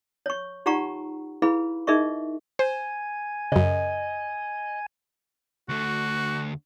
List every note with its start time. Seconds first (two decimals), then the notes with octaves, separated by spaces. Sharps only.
0.26 C#5 C#6
0.66 D#4 F4 G4 F#5 A#5 C#6
1.42 E4 G#4 B4 F5 B5
1.87 D#4 G#4 A#4 D#5 E5 C#6
2.59 C5 G#5
3.52 F#2 C#3 D#5
5.69 D2 A3 F#4